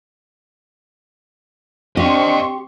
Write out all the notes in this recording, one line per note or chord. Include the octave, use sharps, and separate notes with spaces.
C4 D4 G4 D#5 F5 C6 C#6